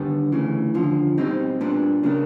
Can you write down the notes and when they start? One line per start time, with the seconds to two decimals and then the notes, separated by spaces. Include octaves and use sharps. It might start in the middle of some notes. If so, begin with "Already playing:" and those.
Already playing: D#2 D3 G3 B3
0.32 D2 C#3 E3
0.74 D#2 D3 F3
1.18 B2 G3 C4 D#4
1.61 A#2 G3 B3 D4
2.03 C#3 F#3 A#3 D4